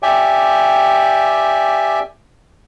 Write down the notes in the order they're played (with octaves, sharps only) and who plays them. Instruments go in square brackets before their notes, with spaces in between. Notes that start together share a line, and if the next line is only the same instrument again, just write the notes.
[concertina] G4 D5 E5 G5 G#5